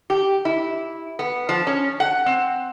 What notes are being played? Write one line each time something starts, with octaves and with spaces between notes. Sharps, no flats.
G4
E4
B3
F3
C#4
F#5
C4